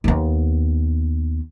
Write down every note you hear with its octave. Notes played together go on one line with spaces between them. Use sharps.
D#2 B3